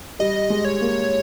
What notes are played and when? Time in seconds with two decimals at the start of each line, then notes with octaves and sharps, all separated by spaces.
0.19 G3 D#5
0.50 G#3
0.65 C#5
0.81 A#3